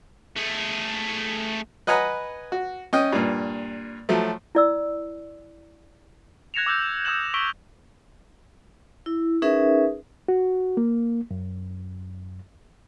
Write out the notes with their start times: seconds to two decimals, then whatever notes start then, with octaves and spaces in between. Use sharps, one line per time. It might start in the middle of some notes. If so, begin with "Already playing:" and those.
0.36 A3 G#4
1.87 B4 D#5 F#5 G#5 A#5 B5
2.52 F#4
2.93 C#4 D#5 G5
3.13 G2 A#2
4.09 F3 F#3 A3
4.55 E4 D5 E6
6.54 F#6 G#6 A#6 C#7 E7 F7
6.66 D6 E6 F#6 G6
7.05 D#6 E6 G6 G#6 E7 F#7
7.34 C#6 E6 B6 D7 F#7 G7
9.06 E4
9.42 C#4 D#4 G#4 A#4 B4 E5
10.28 F#4
10.77 A#3
11.31 F#2